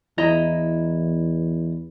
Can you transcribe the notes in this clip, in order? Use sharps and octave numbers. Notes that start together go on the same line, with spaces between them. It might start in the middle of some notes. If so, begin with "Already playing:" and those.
E2 E4 D#5 A#5